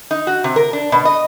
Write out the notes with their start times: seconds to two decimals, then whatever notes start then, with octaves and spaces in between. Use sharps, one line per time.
0.11 D#4
0.27 F#4
0.44 C3
0.56 A#4
0.73 D4
0.92 B2
1.05 D#5